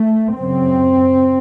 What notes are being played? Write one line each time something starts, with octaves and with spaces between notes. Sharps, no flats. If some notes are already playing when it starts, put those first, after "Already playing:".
Already playing: A3
F#2 C#3 C4